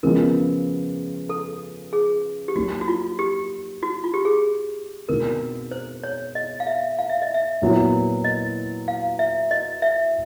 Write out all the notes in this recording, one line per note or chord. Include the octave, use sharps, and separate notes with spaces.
C#3 F3 G#3 B3 A#4
A4
G#4
G4
F#3 A#3 D#4 F#4
F#4
F4
G4
F#4
F4
G4
G#4
B2 G#3 C4 D#4 A#4
C5
C#5
D#5
F5
E5
F5
E5
D#5
E5
A#2 F#3 B3 E4
D#5
F5
E5
D#5
E5